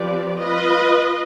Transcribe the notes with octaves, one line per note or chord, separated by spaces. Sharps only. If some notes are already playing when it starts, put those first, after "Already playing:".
Already playing: F3 C4 G4 B4 D5
F4 B4 D#5